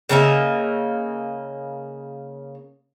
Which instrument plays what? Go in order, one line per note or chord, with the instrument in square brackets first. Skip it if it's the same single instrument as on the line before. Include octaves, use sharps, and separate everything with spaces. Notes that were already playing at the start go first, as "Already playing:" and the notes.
[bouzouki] C#3 A#3 D#4 E5